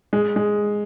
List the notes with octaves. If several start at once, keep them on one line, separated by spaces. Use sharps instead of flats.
G#3
G#3